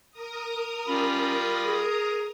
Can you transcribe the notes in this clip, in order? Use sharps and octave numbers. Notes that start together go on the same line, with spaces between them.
A#4 A#5 D#6
G3 C#4 F4 B5
G#4